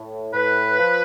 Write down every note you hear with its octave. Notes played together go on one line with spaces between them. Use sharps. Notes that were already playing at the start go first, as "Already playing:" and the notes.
Already playing: A2
A2 B4
F3